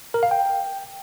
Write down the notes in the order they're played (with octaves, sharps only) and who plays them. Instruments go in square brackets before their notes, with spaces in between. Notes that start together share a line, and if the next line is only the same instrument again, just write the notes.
[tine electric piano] A#4
F5
G5